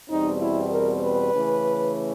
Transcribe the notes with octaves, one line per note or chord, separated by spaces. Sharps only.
E2 B2 G3 C4 D#4
E4
A#4
B4
C#3 E3 A3 C#4